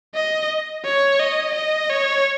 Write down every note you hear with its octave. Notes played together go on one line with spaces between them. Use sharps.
D#5
C#5
D#5
D#5
C#5